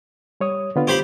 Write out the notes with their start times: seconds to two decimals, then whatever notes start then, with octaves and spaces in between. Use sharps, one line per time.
0.40 G3 C#5 D#6
0.76 D3 B3 F4
0.87 G4 C5 B5